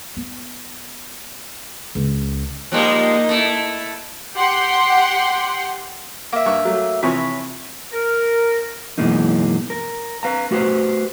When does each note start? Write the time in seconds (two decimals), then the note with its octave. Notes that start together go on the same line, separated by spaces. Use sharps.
0.17 B3
1.95 C#2
2.72 F3 G3 G#3 A#3 D#4
3.29 A3 E4
4.36 G4 F#5 G5 C6
6.33 A#3 E5
6.46 G2 C#6
6.65 F#3 A3
7.03 C3 E3 F3 C#5 B5
7.92 A#4
8.98 F#2 B2 E3 G#3 A#3 D#4
9.70 A#4
10.23 B4 F5 A#5
10.51 A3 F#4 G4 B4 C5